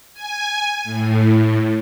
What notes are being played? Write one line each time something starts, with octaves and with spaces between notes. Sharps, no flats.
G#5
A2